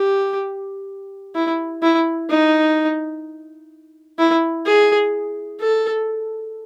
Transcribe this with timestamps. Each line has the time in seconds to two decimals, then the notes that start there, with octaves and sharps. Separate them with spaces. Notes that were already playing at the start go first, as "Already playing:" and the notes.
Already playing: G4
1.35 E4
1.82 E4
2.30 D#4
4.19 E4
4.66 G#4
5.60 A4